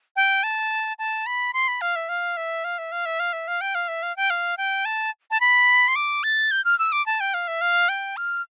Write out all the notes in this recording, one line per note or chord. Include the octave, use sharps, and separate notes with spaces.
G5
A5
A5
B5
C6
B5
F5
E5
F5
E5
F5
E5
F5
E5
F5
E5
F5
G5
F5
E5
F5
G5
F5
G5
A5
A5
B5
C6
D6
A6
G6
F6
E6
D6
A5
G5
F5
E5
F5
G5
F6